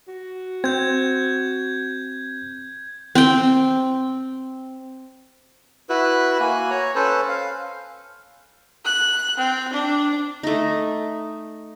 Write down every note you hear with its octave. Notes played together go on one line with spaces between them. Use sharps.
F#4
C4 G6 G#6
C4 G5
E4 F#4 B4
A#3 F#4 G#5
C#5 A#5
C#4 A4 B4 C5
F5
F#6
C4
D4
A3 D#4